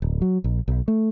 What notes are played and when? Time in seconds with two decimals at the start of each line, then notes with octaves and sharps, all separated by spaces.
0.02 D1
0.22 F#3
0.44 A#1
0.68 B1
0.88 A3